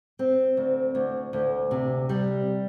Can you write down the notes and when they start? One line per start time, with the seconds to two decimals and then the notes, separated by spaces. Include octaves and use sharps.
0.19 C4
0.57 D2
0.95 D2
1.33 D2
1.71 C3
2.09 G3